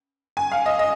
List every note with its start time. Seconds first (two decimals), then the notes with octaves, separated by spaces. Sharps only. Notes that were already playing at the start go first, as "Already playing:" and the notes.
0.37 G#5
0.52 F5
0.66 D#5
0.79 D#5